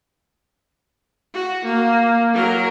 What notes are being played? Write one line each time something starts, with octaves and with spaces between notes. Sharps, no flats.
F#4
A#3
F#3 A#4